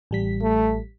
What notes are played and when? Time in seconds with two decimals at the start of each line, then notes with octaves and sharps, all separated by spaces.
0.11 A1 G3 B6
0.42 A3